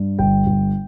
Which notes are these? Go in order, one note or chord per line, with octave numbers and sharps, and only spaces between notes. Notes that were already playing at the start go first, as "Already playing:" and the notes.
Already playing: G2
G1 G5
G1